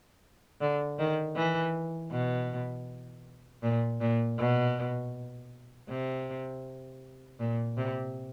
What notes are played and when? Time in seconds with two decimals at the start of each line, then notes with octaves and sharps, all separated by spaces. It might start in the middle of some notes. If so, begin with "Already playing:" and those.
0.61 D3
0.99 D#3
1.36 E3
2.11 B2
3.63 A#2
4.01 A#2
4.38 B2
5.89 C3
7.39 A#2
7.77 C3